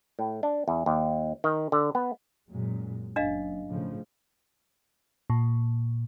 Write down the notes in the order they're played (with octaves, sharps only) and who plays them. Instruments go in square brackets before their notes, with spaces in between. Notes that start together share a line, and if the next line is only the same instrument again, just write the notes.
[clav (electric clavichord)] A2
D4
E2
D#2
D#3
D3
B3
[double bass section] F#2 A#2 G#3
[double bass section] F#1 [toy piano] D4 D#5 F5
[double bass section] A2 C#3 F3
[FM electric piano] A#2